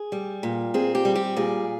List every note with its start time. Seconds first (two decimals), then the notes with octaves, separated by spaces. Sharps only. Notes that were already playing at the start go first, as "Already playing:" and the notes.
Already playing: G#4
0.12 G3
0.43 A#2
0.74 C4 G#4
0.95 G4
1.05 G3
1.16 G4
1.37 A#2 G#4